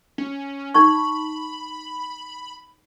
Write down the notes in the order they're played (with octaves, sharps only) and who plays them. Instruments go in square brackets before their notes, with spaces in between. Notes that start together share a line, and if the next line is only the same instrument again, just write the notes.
[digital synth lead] C#4
[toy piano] D#4 A5 C#6 [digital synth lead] B5